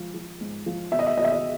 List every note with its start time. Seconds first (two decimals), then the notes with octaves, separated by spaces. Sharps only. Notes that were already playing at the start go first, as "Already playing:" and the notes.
Already playing: F3 G#3
0.14 F3
0.41 G#2
0.66 F3
0.92 B2 E5
0.99 D#5
1.07 E5
1.17 B2 D#5
1.24 E5
1.32 D#5